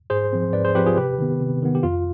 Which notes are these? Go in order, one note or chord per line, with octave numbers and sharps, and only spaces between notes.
G#2 G#4 C5
F3 C4
G#2 B4 D5
G#4 C5
F3 C4 G4 B4
F4 G#4
C3 G4 B4
D#3 B3
C3
D#3 B3
G4
F2 F4